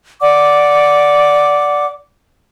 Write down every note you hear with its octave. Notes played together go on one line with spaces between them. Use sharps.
D5 F#5 D6